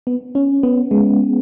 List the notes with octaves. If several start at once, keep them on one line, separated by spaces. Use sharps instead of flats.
B3
C#4
B3
G#3